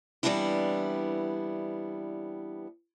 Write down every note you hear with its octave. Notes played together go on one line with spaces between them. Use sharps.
E3 G3 B3 C4 D4 E4